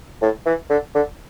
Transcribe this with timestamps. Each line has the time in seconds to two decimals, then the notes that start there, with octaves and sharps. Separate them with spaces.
0.22 A2
0.46 E3
0.69 D3
0.95 D3